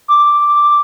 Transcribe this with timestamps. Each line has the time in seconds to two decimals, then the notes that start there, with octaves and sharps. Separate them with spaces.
0.08 D6